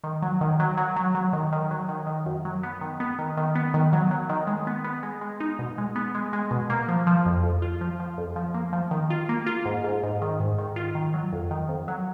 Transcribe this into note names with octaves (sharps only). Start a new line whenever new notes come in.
D#3
F#3
D#3
F#3
F#3
F#3
F#3
D#3
D#3
F#3
D#3
D#3
F#2
F#3
B3
D#3
B3
D#3
D#3
B3
D#3
F#3
F#3
D#3
G#3
B3
B3
G#3
G#3
D#4
B2
G#3
B3
G#3
G#3
B2
A#3
F3
F3
F2
F2
F4
F3
F3
F2
F3
A#3
F3
D#3
F4
A#3
F4
G#2
G#2
G#2
D#3
G#2
D#3
F4
D#3
F#3
F2
D#3
F2
F#3